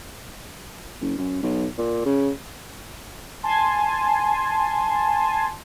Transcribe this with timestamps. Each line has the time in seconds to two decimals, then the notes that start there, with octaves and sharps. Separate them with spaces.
1.01 F#1
1.18 F#2
1.43 B1
1.78 A#2
2.06 C#3
3.43 G#5 A5 C6